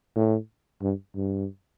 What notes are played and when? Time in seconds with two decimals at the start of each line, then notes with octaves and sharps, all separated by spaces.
0.16 A2
0.82 G2
1.15 G2